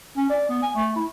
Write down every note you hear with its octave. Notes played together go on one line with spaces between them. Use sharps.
C#4
D5
B3
G#5
A3
E4